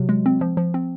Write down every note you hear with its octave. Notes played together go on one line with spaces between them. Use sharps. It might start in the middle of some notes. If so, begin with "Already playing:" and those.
Already playing: C3 F#3
G#3
C4
F3
F3
C4